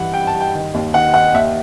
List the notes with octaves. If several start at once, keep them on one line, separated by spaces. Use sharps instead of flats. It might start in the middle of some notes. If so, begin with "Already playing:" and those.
Already playing: G2 E3 F#5
G2 G5
A5
G2
G5
D#3
D#2
D#3 F#5
D#3 F#5
D#2 E5